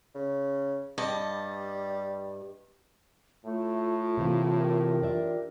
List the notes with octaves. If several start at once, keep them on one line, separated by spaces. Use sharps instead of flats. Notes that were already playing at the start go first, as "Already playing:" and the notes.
C#3
G2 G3 D#5 A5
A2 A3 F4
C3 E3 A#3
G4 A#4
D4 D5 E5